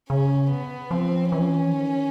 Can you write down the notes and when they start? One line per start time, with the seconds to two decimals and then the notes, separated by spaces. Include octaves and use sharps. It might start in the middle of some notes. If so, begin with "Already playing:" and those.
0.09 C#3 C#4
0.50 B3
0.91 F3 C4
1.31 E3 C#4
1.40 F3
1.48 E3
1.73 D#3